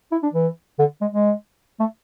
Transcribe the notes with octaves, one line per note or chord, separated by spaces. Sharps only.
E4
D4
E3
D3
G#3
G#3
A3